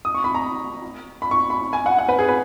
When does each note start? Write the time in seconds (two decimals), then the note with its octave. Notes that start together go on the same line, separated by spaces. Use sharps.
0.05 D#6
0.15 C#6
0.24 B5
0.35 A#5
1.22 B5
1.31 C#6
1.50 B5
1.73 G#5
1.86 F#5
1.99 F#5
2.09 B4
2.19 G#4
2.29 B4